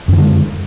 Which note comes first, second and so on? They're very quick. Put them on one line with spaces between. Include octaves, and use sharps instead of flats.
F#2 E3 D3 G#3